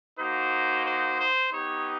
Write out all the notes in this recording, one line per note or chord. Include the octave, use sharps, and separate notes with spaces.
A#3 D#4 F#4 C5
C5
C5
B3 D#4 G4 C#5